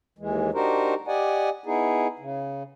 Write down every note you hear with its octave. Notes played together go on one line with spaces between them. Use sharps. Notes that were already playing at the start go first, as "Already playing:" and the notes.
D#2 E3 G#3
D4 D#4 F#4 G4 A#4 C5
G4 D5 D#5 F#5 G#5
B3 D#4 E4 G#4
C#3